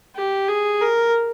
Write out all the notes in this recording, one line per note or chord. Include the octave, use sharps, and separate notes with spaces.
G4
G#4
A#4